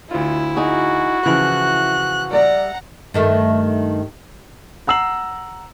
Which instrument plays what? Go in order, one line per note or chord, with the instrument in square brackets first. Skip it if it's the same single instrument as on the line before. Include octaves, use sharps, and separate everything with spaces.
[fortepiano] D2 F4 [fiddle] E4
[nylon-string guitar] D#4 G#4 [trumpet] F#4
[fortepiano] C#3 E3 F3 [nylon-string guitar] E4 [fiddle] F#6
[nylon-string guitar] G3 D5 E5 [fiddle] F#5 A#5
[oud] G2 D#3 A3
[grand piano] F#5 A#5 E6 C7 F#7